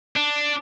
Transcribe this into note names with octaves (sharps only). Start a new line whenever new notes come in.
D4